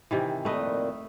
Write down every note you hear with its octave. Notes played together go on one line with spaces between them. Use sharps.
C3 D#3 E3
F2 A#2 D#3 A3 B4 D#5